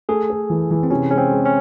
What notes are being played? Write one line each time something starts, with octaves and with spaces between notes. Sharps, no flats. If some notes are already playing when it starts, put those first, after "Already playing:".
A3 G#4
A4
E3
E3
C4
C3 C#4
G#3 C#4
C4
G#3
C#4